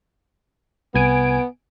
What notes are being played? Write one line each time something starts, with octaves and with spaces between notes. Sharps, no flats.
C2 B3 G#5 D7